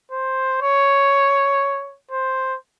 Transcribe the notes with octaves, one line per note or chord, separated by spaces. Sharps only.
C5
C#5
C5